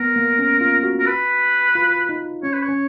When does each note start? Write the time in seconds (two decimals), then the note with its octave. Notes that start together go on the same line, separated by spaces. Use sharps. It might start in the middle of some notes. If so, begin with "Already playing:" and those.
Already playing: B3 A#4
0.16 A#3
0.39 C#4
0.61 F4
0.83 F#4
1.00 A#4
1.06 B4
1.75 F4
2.09 D#4
2.43 C#4 C#5
2.54 B4
2.63 C#5
2.69 C#4